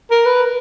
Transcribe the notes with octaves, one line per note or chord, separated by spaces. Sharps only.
A#4
B4